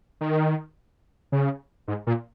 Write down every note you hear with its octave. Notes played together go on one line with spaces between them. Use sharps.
D#3
C#3
G#2
A#2